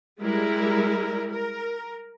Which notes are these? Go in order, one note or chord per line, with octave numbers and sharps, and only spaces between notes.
G3 G#3 E4 A#4
A#4